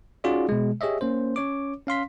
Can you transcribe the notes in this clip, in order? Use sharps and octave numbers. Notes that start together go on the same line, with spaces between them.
C#4 D#4 F4 F#4 G#4 D5
B2 G#3
G4 G#4 C#5 D#5 E5
A#3 C#4 C5
C#4 C#5 D6
C#4 F5 C6 B6